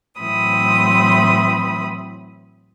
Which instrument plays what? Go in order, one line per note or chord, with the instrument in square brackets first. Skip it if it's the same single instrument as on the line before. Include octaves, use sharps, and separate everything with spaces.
[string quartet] A2 E3 F#3 C4 B5 D#6